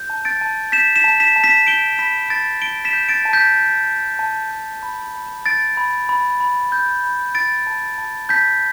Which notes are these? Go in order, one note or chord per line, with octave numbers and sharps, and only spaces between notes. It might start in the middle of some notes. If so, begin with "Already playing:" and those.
Already playing: G6
A5
A6 D7
A5
G6 B6 E7
B6 E7
A5
B6 E7
A5
B6 E7
G6 D7 G7
B5 B6 E7
B5 A6 D7
A5 D7 G7
B6 E7
G6
A6 D7
A5
G6 B6
G6
A5
A5
G6
B5
B5
G6 A6 D7
B5
B5
B5
G6
B5
G6 A6 D7
A5
A5
A5 G6 B6